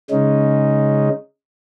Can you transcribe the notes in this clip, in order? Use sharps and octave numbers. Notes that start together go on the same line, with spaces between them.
C#3 G#3 C#4 D#4